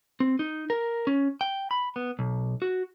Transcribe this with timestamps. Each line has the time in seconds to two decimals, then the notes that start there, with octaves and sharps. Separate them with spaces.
0.20 C4
0.39 D#4
0.70 A#4
1.07 C#4
1.41 G5
1.71 B5
1.96 B3
2.19 B1
2.62 F#4